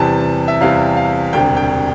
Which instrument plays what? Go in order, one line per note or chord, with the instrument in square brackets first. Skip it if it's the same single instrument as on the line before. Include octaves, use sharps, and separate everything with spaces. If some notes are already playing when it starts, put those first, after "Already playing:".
Already playing: [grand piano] E2 C3 E3 G3 A5
E5
E2 C3 E3 G3 F5
F5
E1 D2 C3 G3 G5
G5